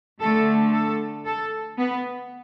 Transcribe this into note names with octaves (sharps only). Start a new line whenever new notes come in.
D3 A3 A4
A4
A4
B3